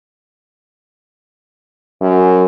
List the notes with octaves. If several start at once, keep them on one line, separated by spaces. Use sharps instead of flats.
F#2